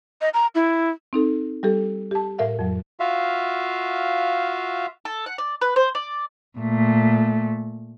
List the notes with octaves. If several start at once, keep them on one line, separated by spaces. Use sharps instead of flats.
D#5
A#5
E4
C4 D#4 A4
G3 G4 A4
G4 A5
A2 A#4 E5 F5
F2 F#3
F4 F#4 E5 F5
A4
F#5
D5
B4
C5
D5
A#2 A3